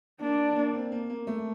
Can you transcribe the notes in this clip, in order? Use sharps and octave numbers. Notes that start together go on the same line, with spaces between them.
A#3 D4
A#3
C4
A#3
A#3
A3